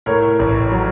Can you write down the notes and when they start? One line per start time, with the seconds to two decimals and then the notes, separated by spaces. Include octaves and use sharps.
0.06 A2 A#4 C#5
0.39 A1
0.72 F#3